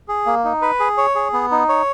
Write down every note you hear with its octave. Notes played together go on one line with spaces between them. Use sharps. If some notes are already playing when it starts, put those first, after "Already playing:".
G#4
A#3
D#4
B4
G#4
C#5
G#4
B3
D#4
C#5